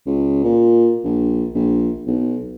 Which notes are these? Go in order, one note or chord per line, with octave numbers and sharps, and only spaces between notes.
C#2
A#2
A#1
A#1
B1